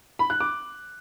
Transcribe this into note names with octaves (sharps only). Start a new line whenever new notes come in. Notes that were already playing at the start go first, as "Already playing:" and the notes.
B5
F#6
D6